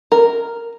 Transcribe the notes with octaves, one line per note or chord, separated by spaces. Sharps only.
A#4